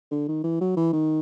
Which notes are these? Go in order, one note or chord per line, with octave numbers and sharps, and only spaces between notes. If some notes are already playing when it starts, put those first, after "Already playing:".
D3
D#3
E3
F#3
E3
D#3